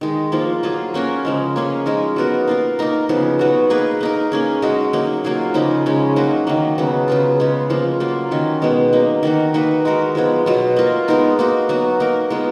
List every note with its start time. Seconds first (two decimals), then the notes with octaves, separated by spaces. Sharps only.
0.01 D#3 G#3 D#4
0.32 F3 A#3 F4
0.63 F#3 A#3 F4 G#4
0.94 A#3 C#4 F#4 A#4
1.25 C#3 F3 G#3
1.56 A#3 C#4 G#4
1.86 F3 G#3 D#4 A#4
2.16 F#3 B3 F#4 A#4
2.48 A#3 F4 A#4
2.79 A#3 D#4 A#4
3.09 C#3 F3 B3
3.39 F#3 B3 F#4
3.70 A#3 D#4 G#4 B4
4.01 A#3 D#4 A#4
4.32 A#3 C#4 G#4
4.62 G#3 D#4 F#4
4.93 F#3 A#3 D#4
5.24 F#3 A#3 F4 G#4
5.54 C#3 F3 A#3 D#4
5.86 C#3 G#3 C#4
6.16 F#3 A#3 D#4 F#4
6.47 D#3 F#3 A#3
6.78 C#3 F#3 B3
7.08 C#3 F#3 B3 F4
7.40 C#3 G#3 B3
7.70 F3 A#3 F4
8.00 F#3 A#3 F4
8.31 D#3 F#3 C#4
8.62 B2 G#3 B3
8.93 F#3 A#3 D#4
9.23 D#3 A#3 D#4 F#4
9.54 A#3 D#4 F#4 B4
9.85 G#3 D#4 F#4 A#4
10.15 F3 G#3 B3
10.46 B2 F#3 B3
10.76 A#3 F4 A#4
11.08 G#3 B3 D#4 A#4
11.39 A#3 D#4 F#4
11.69 F#3 B3 F#4
12.00 A#3 D#4 A#4
12.30 G#3 B3 F4